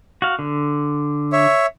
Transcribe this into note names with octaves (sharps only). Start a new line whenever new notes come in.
F#4 F5
D3
C#5 E5